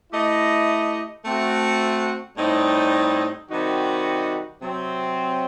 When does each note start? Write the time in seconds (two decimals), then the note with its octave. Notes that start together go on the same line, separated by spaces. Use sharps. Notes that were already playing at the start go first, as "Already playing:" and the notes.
0.12 A3 E4 G4 D#5
1.25 A3 C4 F#4
2.37 A2 G3 C4 D#4
3.50 C3 D#3 G3 D#4 F#4
4.62 C3 F#3 C4